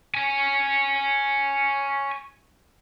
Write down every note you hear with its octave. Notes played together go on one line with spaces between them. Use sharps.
C#5 G#5